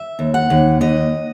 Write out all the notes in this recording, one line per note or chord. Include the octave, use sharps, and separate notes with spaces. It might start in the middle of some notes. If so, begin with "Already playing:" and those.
Already playing: E5
D#2
F#5
D#2
D#2 D#5